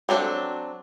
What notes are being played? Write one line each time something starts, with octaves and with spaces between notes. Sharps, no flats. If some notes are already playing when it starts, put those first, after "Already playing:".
F#3 C4 D4 A4